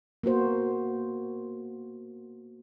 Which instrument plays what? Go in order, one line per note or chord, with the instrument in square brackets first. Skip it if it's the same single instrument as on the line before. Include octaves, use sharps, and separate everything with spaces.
[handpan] A#3 B3 F#4 C5